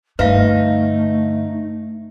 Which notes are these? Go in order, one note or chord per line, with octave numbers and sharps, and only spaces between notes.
G2 D3 A3 D#4 B4 E5 F5